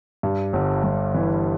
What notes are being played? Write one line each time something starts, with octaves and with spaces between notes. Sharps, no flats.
G2
G1
G1
E3